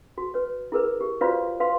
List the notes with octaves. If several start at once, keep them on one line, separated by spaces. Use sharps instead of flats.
F#4
B4 C#5
E4 G#4 A#4 B4
G4
F4 F#4 B4 C5 D5 F5
B4 F5 C6